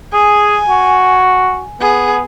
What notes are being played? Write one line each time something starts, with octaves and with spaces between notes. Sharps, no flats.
G#4 G#5
F#4
B3 G#4